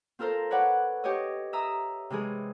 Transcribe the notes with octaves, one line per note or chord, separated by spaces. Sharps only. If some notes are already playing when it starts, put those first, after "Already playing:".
C4 F4 A4 A#4 C5
B4 C#5 D5 F#5
G4 C#5 D#5
E5 A#5 D#6 E6
C3 E3 G#3 G#4